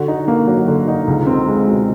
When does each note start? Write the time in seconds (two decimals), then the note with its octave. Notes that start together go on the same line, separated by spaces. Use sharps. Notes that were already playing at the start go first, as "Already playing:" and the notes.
Already playing: D3 F#4
0.08 D#4
0.28 A#3
0.47 F#3
0.68 D3
0.88 D#4
1.07 C#2
1.27 C4
1.47 G#3
1.67 B2